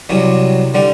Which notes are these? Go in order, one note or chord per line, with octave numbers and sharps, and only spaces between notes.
C2 C3 F#3
D3 G3